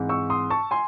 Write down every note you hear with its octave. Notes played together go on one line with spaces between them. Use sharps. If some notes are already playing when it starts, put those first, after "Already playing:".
Already playing: G#2 E3 C4
C#6 E6
C6 D#6
A5 C#6
G#5 C6